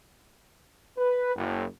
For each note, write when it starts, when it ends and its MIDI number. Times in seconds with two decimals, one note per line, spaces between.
0.98 1.34 71
1.35 1.64 30